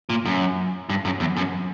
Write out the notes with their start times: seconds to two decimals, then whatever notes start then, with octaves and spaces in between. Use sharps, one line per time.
0.09 A#2
0.25 F#2
0.89 G2
1.05 F#2
1.20 E2
1.36 F#2